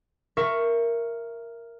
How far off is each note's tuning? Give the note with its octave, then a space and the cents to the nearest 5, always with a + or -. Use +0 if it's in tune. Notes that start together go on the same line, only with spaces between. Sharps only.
A#4 +0 E5 +20 C#6 +0